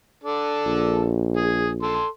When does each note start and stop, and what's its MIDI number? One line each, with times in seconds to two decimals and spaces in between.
0.24 1.10 62
0.24 1.10 69
0.67 2.01 34
1.37 1.69 68
1.83 2.06 69
1.83 2.06 84